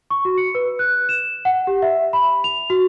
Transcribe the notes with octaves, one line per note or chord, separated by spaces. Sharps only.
C#6
F#4
C#7
B4
F#6
E7
F#5
G4
E5
B5
F7
F#4